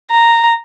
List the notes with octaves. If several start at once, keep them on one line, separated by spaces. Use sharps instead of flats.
A#5